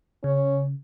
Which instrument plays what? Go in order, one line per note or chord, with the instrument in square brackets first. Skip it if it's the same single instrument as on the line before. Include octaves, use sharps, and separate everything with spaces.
[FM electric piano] C#3 [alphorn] C#4